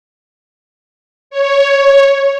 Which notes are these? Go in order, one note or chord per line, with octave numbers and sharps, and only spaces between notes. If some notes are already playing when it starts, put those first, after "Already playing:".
C#5